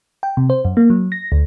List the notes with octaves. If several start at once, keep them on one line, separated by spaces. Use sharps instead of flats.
G5
C3
C5
F#2
A#3
F#3
A#6
D2